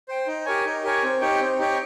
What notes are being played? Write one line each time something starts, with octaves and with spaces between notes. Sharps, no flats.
C5 G5
D#4
G4 A#4 C#5 G#5
D#4
G4 A#4 C#5 G#5
C4
D#4 G4 C#5 G5
C4
D#4 G4 C#5 G5